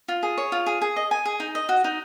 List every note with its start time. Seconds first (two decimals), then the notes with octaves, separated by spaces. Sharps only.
0.08 F4
0.23 G#4
0.38 C#5
0.52 F4
0.66 G#4
0.82 G#4
0.96 D#5
1.11 G#5
1.25 G#4
1.40 D#4
1.55 D#5
1.69 F#4
1.84 D#4